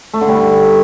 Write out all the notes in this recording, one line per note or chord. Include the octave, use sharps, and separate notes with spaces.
A3
D3
G3